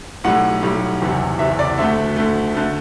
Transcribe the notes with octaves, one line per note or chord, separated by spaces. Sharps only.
B1 A2 G3 F#5
B1 A2 G3
F#1 E2 C3
F#1 E2 C3 E5
D5
D2 D3 A3 E5
D2 D3 A3
D3 A3